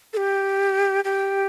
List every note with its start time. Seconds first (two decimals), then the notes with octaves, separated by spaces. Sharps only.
0.13 A4
0.17 G4
1.04 G4